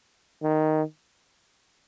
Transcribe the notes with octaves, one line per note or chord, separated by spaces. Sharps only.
D#3